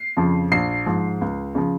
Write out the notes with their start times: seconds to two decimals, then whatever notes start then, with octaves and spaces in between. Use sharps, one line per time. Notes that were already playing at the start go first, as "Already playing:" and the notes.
Already playing: C7
0.17 F2 C#3 F3
0.51 A#1 C7
0.86 G#2 F3
1.21 C#2
1.55 C#3 F3